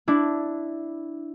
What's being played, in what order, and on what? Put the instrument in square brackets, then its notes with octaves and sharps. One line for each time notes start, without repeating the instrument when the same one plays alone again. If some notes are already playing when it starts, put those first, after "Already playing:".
[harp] D4 E4